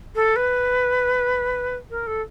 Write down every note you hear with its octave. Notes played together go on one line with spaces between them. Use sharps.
A4
B4
A#4
A4